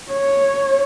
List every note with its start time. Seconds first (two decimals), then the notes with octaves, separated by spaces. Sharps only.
0.12 C#5